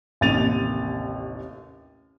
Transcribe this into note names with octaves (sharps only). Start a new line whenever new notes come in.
A1 D#2 C3 A6 D#7 F7